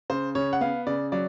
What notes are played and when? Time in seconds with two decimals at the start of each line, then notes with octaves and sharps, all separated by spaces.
0.10 C#3 C5
0.35 C#3 C#5
0.53 F#5
0.61 B3 F5
0.87 C#3 D5
1.12 F#3 D5